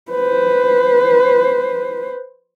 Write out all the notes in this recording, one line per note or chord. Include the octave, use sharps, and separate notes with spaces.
B4 C5